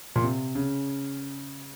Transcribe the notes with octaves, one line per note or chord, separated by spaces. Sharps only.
A#2
C3
C#3